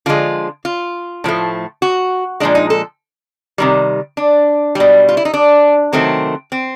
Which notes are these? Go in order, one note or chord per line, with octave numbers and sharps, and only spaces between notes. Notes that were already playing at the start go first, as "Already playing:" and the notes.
D3 F3 G#3 F4
F4
A2 F3 A3
F#4
A#2 F3 G#3 D4
D#4
A4
C3 D#3 G3
D4
B2 G3
F4
E4
D#4
D4
C3 D#3 F#3 A3 C4
C4